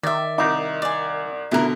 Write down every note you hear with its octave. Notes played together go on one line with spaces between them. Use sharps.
D#3 D5 E5
C2 D#4 D6
D5 G#5
B2 D3 E4 A#4